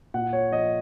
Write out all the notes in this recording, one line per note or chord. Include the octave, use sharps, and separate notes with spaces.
A#2 F#5
C#5
F3 D#5